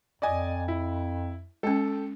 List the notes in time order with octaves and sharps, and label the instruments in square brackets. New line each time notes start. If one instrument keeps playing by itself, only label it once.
[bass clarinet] F2 [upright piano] D5 D#5 G#5
[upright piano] E4
[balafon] G#3 C#4 [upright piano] A4 G5